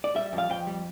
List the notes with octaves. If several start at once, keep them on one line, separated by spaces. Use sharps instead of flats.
D5
G3 E5
F2
F5
F2 G5
G3